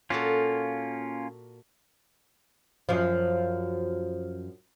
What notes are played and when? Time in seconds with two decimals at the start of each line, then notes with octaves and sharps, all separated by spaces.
0.10 A#2 A#3 C#4 F4 F#4 A4
2.89 F#2 F3